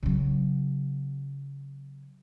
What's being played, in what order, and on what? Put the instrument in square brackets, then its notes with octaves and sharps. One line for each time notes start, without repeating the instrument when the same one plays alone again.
[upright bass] C#3 F#3